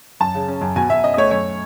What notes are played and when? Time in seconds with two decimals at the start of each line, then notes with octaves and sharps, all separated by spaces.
0.20 F#2 A5
0.35 C#3
0.48 C#4
0.61 F#2
0.76 B2 G#5
0.89 B2 E5
1.03 C#4 D#5
1.14 D#5
1.17 A3 C#5
1.31 F#2 C#5